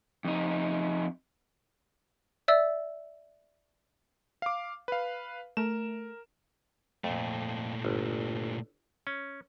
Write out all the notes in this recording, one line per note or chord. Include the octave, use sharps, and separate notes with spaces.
F2 D#4
D5 E5 E6
F5 D6
B4 F5
A3 A#4 E7
F2 A#2 A3
G1
C#4